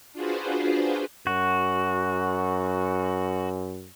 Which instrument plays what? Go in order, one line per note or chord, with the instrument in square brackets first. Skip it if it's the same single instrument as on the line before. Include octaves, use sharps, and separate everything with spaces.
[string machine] D4 F4 F#4 G#4 B4 C5
[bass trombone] F#2 [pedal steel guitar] F#4